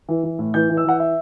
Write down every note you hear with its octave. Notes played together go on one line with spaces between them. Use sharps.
E3
E3
A2
E3 G6
E3
E6
E3 F#5
E5